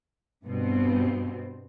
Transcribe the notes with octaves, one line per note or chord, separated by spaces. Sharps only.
G2 B2 B3 C4